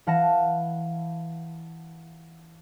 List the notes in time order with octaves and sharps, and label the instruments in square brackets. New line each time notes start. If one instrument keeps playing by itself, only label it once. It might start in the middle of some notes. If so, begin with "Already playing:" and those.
[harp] E3 F5 F#5 A5 A#6 E7